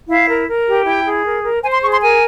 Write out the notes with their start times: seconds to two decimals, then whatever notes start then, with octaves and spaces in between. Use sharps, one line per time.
0.08 E4 F5
0.28 A#4
0.47 A#4
0.67 G4
0.86 E4 G5
1.05 G#4
1.25 A#4
1.43 A#4
1.62 C5 G#5
1.73 C6
1.81 G#4 C#6
1.92 C6
2.01 A#4 G#5